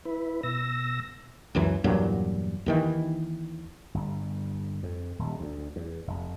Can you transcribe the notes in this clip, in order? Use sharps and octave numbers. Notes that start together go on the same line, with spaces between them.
E4 B4
B2 E6 A#6
C#2 F#2 E3
E2 G2 A#2 F#3
D#2 D#3 E3
G1
F2
D#1
D2
E2
F1